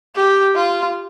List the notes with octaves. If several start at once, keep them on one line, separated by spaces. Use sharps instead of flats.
G4
F4